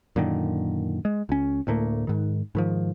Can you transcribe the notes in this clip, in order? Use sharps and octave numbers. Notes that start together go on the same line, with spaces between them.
F#2 A#2 D3 D#3
G#3
C#2 C#4
D2 A2 A3 A#3
G#2 D#3
G#2 D#3 F3